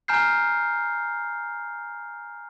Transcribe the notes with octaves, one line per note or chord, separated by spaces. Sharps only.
G#5 A#5 F6 G6 C7